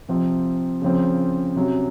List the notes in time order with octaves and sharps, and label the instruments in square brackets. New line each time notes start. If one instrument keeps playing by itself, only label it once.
[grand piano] C3 F3 C4
C#3 F3 C4
C3 F#3 C#4